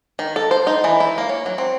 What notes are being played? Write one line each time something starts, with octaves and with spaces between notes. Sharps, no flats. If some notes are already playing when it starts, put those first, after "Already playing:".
D#3
A4
C5
D#4
E3
E4
A#3
C#5
F#3
C4